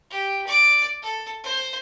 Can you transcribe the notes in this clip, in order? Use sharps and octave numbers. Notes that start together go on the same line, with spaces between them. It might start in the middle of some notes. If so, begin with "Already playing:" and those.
G4
D5 D6
A4
C5